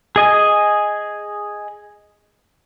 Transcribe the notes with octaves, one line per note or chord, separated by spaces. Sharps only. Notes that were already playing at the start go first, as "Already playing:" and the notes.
G#4 D#5 G#5